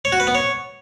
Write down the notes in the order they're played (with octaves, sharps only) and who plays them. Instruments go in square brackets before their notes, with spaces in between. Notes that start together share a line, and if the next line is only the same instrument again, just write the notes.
[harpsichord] C#5
F#4
B4
B3
C#5